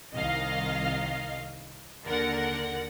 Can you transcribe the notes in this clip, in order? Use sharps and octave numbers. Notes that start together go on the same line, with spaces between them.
C2 D#3 D#5 F5
D#2 D3 A#4 F#5